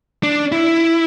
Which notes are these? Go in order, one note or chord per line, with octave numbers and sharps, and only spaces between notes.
D4
E4